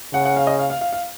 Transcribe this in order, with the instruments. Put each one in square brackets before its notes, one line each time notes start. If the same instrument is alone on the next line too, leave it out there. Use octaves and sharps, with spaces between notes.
[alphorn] C#3 [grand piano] F#5
[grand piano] F#5
F5
D#5
F5
F5
F5
F5